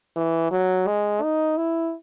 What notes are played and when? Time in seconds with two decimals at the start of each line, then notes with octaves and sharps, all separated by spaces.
0.16 E3
0.51 F#3
0.87 G#3
1.22 D#4
1.57 E4